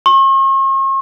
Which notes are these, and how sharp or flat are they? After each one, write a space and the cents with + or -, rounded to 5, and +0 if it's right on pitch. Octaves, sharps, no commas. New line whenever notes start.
C#6 -45